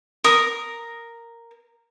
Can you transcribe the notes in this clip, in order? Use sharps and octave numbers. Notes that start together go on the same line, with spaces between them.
A#4 D#6